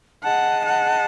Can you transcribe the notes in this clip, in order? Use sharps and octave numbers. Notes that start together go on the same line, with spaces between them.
G#4 D#5 F#5 A5
F#5